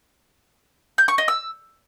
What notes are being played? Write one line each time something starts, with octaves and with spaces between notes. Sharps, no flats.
G6
C#6
D#5
E6